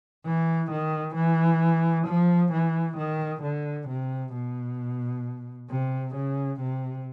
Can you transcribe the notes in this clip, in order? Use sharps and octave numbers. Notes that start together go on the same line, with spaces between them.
E3
D#3
E3
F3
E3
D#3
D3
C3
B2
C3
C#3
C3